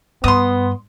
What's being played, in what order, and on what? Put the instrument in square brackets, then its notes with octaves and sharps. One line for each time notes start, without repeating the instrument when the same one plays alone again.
[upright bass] G2 [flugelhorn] B3 [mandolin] C6 D#6